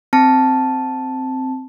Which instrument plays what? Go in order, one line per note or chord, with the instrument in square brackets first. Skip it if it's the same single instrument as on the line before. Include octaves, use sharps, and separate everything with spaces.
[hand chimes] C4 A5